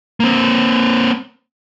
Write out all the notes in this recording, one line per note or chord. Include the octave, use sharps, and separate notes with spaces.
A#3 C4